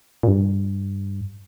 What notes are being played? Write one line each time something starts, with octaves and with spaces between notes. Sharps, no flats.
A#2
G2